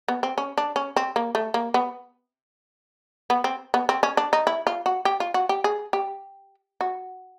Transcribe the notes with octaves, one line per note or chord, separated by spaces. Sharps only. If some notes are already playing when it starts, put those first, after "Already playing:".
B3
C4
C#4
D4
C#4
C4
A#3
A3
A#3
B3
B3
C4
B3
C4
C#4
D4
D#4
E4
F4
F#4
G4
F4
F#4
G4
G#4
G4
F#4